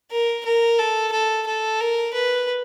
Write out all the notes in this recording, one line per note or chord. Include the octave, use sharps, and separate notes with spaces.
A#4
A#4
A4
A4
A4
A#4
B4